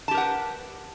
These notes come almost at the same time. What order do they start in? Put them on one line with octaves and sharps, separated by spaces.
A5 G4 A#4 F#5 B4